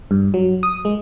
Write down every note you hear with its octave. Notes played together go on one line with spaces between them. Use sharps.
G2
F#3
D#6
G#3